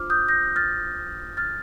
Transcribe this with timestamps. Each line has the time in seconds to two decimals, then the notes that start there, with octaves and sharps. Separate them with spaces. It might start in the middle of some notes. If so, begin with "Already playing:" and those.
Already playing: D4 F4 C5 D6 F6
0.10 D#6 G6
0.28 G6 A#6
0.56 F6 A6
1.37 F6 A6